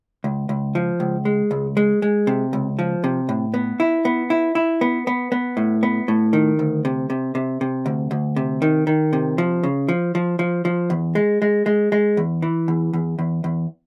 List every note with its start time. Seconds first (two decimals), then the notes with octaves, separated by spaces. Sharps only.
0.24 C#2
0.49 C#2
0.75 F3
1.00 C#2
1.25 G#3
1.51 C#2
1.77 G#3
2.02 G#3
2.27 C3
2.53 C#2
2.79 F3
3.04 C3
3.29 A2
3.54 B3
3.80 E4
4.05 B3
4.30 E4
4.55 E4
4.81 B3
5.07 B3
5.32 B3
5.57 A2
5.83 B3
6.08 A2
6.33 D#3
6.59 D2
6.85 C3
7.10 C3
7.35 C3
7.61 C3
7.86 D2
8.11 D2
8.36 C3
8.62 D#3
8.87 D#3
9.13 C3
9.38 F3
9.63 C#3
9.88 F3
10.15 F3
10.39 F3
10.65 F3
10.90 E2
11.15 G#3
11.42 G#3
11.66 G#3
11.92 G#3
12.17 E2
12.42 E3
12.68 E2
12.93 E2
13.19 E2
13.44 E2